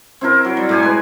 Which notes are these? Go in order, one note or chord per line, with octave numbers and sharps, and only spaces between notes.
C4 E4 A#4
F#3
G3
A2 G4 G#5
G#3 B4